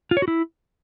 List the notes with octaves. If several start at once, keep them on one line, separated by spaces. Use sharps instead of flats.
F4
C#5
F#4
E4